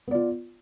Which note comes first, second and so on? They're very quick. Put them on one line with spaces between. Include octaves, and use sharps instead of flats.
B3 D5 F4